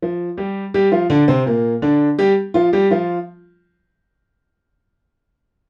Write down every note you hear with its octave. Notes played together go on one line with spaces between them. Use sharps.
F3
G3 G4
G3 G4
F3 F4
D3 D4
C3 C4
A#2 A#3
D3 D4
G3 G4
F3 F4
G3 G4
F3 F4